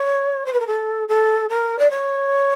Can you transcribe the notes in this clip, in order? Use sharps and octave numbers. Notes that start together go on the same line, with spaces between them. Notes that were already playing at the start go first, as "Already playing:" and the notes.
Already playing: C#5
C5
B4
A#4
A4
A4
A#4
D5
C#5